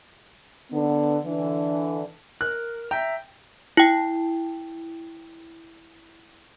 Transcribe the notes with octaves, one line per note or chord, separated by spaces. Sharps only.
D3 B3
D3 E3
A#4 F#6
E5 G5 A#5
E4 G5